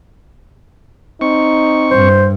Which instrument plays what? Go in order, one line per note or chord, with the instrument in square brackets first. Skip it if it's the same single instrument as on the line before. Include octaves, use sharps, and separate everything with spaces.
[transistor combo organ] C4 C#6 [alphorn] D#4
[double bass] G2 [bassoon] C5